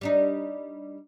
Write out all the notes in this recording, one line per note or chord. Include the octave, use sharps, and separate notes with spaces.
G3 D4 D#4